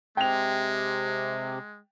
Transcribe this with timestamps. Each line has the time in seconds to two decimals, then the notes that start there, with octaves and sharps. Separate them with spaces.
0.17 C3 G#3 G5 F7